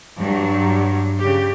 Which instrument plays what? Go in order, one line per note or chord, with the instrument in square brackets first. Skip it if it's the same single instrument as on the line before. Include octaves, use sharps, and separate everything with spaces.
[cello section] G2 F#3 G3
C#3 G4